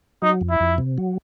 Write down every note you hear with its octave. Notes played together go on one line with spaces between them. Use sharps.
F#3 D#4
F2
E4
F2
C3
F#3